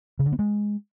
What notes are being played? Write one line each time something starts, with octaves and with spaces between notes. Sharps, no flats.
C#3
D3
B3
G#3